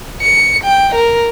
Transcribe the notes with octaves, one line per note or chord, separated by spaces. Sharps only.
C#7
G5
A#4